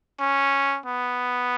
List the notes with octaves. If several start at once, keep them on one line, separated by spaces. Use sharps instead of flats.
C#4
B3